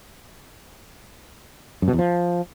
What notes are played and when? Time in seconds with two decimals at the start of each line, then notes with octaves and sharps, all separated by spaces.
1.82 F#2
1.88 B2
1.93 E2
1.99 F3